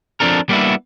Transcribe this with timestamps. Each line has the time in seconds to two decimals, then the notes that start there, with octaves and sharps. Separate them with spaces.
0.20 F3 C4 D4 A4 A#4
0.49 G3 A#3 B3 D4 E4